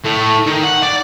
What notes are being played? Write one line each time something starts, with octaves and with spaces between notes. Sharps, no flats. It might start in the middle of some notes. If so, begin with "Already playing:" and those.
A2
D#3
F#5
D5